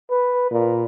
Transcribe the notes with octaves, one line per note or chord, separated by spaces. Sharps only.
B4
A#2